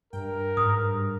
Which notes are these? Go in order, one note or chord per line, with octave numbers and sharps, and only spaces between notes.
G2 A#4 G5
G#2 D#6